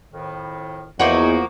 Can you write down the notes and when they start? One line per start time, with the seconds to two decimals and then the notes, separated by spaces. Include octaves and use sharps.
0.13 F2 A2 D#3
1.00 E2 F3 A#3 D#4 E4 F#4 C#6